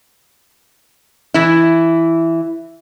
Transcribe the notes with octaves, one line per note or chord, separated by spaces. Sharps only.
E3 E4